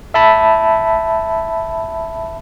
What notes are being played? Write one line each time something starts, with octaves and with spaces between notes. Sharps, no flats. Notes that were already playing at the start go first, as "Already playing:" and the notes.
E5 A5 B5